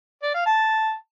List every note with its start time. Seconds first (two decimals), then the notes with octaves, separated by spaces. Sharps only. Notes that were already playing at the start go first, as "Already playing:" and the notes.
0.22 D5
0.34 F5
0.46 A5